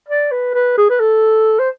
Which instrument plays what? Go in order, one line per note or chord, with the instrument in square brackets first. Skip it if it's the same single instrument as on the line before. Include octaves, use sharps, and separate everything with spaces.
[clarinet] D5
B4
B4
G#4
B4
A4
C5